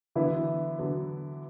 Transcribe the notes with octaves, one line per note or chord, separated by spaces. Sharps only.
D3 E3 F#3 B3 E4
D3 F#3 B3